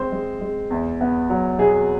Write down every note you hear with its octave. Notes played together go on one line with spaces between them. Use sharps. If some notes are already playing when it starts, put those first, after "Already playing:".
Already playing: G#3 C4 C5
G#3
G#3
E2
B3
F#3
B2 G#4